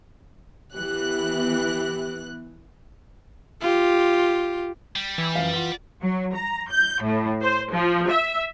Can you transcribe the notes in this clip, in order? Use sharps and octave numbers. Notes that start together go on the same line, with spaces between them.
E3 B3 G4 F#6
F4 G4
G3
E3
F#2 F3 F5
F4 F#5 G7
F#3
A#5
G6
A2
C5
F3
E5